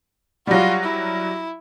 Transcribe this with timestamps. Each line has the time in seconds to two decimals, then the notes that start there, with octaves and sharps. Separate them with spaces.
0.47 F#3 G3 F4 F#4
0.84 E4